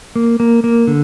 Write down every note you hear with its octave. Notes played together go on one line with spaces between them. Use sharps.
A#3
A#3
A#3
D3